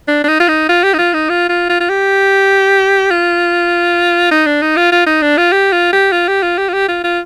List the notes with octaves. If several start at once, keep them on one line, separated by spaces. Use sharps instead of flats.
D4
D4
D#4
F4
D#4
F4
G4
D#4
F4
D#4
F4
F4
F4
F4
G4
F4
D#4
D4
D#4
F4
F4
D#4
D4
F4
G4
F4
G4
F4
G4
F4
G4
F4
G4
F4
F4